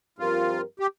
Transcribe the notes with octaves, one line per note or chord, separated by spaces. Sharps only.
G2 F3 C4 F4 G4 A#4
G4